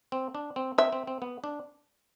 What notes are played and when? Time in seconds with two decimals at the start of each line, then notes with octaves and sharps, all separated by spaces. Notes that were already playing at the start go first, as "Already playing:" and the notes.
0.12 C4
0.35 D4
0.56 C4
0.78 C4 E5
0.92 C4
1.07 C4
1.22 B3
1.44 D4